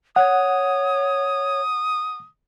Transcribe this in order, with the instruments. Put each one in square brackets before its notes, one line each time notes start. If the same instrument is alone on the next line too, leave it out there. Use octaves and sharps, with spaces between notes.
[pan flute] C#5 [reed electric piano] F#5 [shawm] D#6